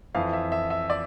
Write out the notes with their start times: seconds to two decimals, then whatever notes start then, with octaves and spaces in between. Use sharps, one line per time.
0.15 F2 E3 F5
0.33 E5
0.52 E5
0.70 E5
0.90 D5